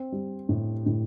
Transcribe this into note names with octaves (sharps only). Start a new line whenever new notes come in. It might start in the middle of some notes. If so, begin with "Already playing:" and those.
Already playing: C4
G3
A2
A2